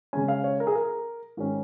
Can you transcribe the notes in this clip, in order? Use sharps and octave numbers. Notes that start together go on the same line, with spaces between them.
C#3 G#3 C#4 G#5
F5
C#5
A#4
G#4
A#4
G#2 D#3 C#4